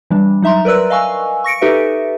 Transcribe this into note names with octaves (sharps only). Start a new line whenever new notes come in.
E3 G3 D4
F#3 D#4 E5 A#5 C6
A#4 B4 D5 E6 F#6
D#5 F5 G#5 C#6 E6
C#6 A#6 C#7 D7
D#4 G4 A4 B4 E5